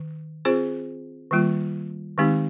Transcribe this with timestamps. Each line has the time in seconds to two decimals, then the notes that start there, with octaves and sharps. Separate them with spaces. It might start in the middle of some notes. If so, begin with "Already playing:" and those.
Already playing: D#3
0.45 C4 F4 G#4 C5
1.31 D#3 G3 A#3 F4
2.18 D#3 G#3 C4 D#4 G4